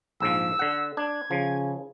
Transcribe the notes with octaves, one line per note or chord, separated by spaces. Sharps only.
A#1 G#2 F3 E6
D3 F#5
D4 G#6
C#3 F3